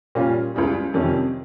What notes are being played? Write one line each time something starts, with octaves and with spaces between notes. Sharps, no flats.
A#2 G3 C#4 F4
C#2 C#3 G3
F2 C3 D#3 G3 C#4